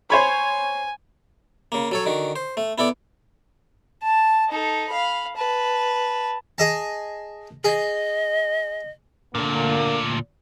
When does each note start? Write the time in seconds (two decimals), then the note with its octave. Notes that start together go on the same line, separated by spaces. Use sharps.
0.10 C5 C#5 G#5 B5
1.72 C#3 A#3
1.91 F#3 A4 C#5
2.06 D3 D#3 F#4
2.36 C5
2.57 A3
2.78 B3 E4 A4 D5
4.03 A5
4.49 D#4 A4
4.89 F5 B5
5.36 B4 A5
6.58 G#4 D#5 A5
7.64 G#4 D#5
9.35 D2 A#2 D3 A#3